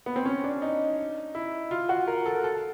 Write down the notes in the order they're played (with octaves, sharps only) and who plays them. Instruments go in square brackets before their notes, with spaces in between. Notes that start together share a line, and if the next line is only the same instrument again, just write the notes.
[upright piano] B3
C4
C#4
D4
D#4
E4
F4
F#4
A#4
A4
A4